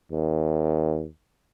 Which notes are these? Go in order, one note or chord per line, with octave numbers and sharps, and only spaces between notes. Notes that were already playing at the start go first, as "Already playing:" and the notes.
D#2